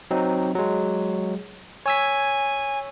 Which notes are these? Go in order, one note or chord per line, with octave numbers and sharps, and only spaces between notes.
F#3 C4 D#4
F#3 G#3
C#5 G#5 E6 B6